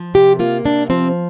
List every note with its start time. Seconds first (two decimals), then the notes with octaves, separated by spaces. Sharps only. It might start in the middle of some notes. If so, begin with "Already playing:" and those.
Already playing: F3
0.14 C3 G4
0.39 A#3 F4
0.65 C3 D4
0.90 F3 C4